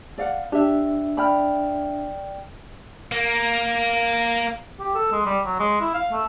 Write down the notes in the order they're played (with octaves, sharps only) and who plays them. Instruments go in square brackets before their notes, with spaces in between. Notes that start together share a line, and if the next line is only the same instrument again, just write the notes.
[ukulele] D5 F5 F#5
[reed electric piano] D4 E5 [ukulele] G4
[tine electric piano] D5 G5 F6 [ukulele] B5
[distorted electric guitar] A#3
[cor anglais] G4
A4
G#3
G3
F#3
G#3
E4
F5
A3